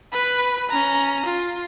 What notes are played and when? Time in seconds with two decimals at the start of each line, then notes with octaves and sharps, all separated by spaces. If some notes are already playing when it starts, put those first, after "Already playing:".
0.12 B4 B5
0.69 C#4 A#5
1.26 F4